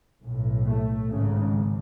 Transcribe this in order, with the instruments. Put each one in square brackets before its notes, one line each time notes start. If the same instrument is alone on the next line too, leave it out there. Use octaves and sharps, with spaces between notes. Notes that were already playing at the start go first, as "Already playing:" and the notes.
[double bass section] B1 A2
A3
G#1 G#2 C#3